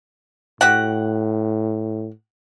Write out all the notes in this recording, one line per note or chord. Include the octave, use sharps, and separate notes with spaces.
A2 F#4 G4 F#5